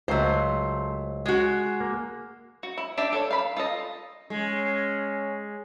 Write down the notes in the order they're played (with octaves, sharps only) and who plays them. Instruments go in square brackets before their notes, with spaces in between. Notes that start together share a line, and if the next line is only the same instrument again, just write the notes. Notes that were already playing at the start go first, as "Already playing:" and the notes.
[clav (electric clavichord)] C#2 F#3 [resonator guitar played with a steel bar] A3 C5
[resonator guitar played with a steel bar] G#3 F#4
[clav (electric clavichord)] A#3
[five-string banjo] F#4
E4
D4 G4 D5 E5
A4 C#5
F5 B5
F4 A4 D#5
[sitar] G#3 [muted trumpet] C#4